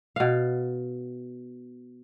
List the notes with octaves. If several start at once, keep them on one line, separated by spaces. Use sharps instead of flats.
B2 F5